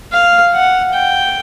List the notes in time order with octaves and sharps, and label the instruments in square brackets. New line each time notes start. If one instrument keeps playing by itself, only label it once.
[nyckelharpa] F5
F#5
G5